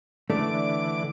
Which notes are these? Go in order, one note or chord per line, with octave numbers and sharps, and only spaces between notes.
D3 E3 A3 D4 D6